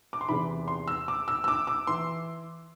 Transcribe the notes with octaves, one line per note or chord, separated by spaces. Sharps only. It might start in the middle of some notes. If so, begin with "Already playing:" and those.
D6
C6
E2 C3 E3 B5
C6
E6
D6
E6
E6
D6
D6
E3 C6